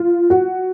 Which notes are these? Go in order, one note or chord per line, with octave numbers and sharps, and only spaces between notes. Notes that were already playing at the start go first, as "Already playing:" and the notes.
Already playing: F4
F#4